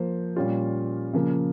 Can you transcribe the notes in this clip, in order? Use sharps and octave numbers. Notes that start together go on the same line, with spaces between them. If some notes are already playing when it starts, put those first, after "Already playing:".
Already playing: F3 A#3 C5
A#2 G3 C#4 F4
C#3 F3 A#3